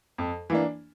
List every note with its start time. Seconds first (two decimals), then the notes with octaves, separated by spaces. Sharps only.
0.18 F2
0.50 E3 A#3 D4